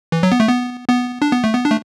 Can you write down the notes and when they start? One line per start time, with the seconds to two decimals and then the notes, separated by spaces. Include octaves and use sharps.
0.12 E3
0.23 F#3
0.32 B3
0.40 A3
0.48 B3
0.89 B3
1.22 D4
1.33 B3
1.44 A3
1.54 B3
1.65 D4
1.71 A3